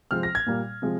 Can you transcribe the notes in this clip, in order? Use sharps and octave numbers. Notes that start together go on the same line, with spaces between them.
C3 F3 G#3 C4 F6
A#6
G#6
A#2 G3 A#3
C3 F3 G#3